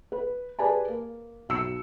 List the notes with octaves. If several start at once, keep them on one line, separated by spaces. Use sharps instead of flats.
B4
G4 G#4 B4 D5 G#5 A5
A#3
B1 E6 C#7